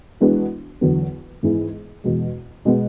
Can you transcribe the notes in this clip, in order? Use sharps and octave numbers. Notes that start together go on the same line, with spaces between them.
E3 G#3 B3 D4 F#4
E2 D3 F#3 B3
G#2 E3 B3 E4 G#4
E2 B2 G#3
B2 G#3 B3